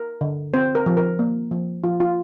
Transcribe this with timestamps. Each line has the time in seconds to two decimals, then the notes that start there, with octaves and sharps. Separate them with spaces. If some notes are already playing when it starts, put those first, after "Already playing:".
Already playing: A#4
0.21 D3
0.54 C4 C5
0.75 A#4
0.86 F3
0.97 A#4
1.19 A#3
1.51 F3
1.84 F3 F4
2.00 F4